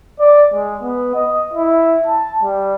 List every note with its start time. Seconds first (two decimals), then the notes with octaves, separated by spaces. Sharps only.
0.20 D5
0.54 G#3
0.82 B3
1.15 D#5
1.54 E4
2.07 A5
2.43 G3